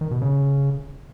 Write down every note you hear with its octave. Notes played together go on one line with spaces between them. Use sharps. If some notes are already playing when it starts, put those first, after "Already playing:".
D#3
B2
C#3